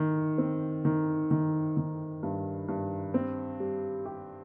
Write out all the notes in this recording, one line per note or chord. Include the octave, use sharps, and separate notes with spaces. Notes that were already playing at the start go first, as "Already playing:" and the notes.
Already playing: D#3
C4
D#3
D#3
D#3
G2
G2
C4
G3
G4